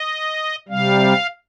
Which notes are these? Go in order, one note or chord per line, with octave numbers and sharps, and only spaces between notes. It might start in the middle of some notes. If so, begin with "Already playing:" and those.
Already playing: D#5
C3 G3 F5